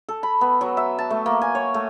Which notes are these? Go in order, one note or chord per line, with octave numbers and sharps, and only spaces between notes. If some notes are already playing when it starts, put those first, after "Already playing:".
A4
B5
B3
F#3
E5
A5
A3
A#3
G#5
C#5
A3